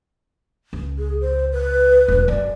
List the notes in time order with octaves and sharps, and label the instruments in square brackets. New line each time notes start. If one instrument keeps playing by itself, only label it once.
[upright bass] C#2
[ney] G#4
C5
B4
[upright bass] E1 A#1
[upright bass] F#2 [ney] D5